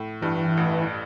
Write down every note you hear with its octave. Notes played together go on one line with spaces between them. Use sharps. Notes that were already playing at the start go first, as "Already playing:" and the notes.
Already playing: A2
G2 E3
A1